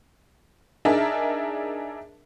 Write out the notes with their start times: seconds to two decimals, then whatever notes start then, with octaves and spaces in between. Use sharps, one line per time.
0.85 D4 D#4 G#4 A#4 E5 A5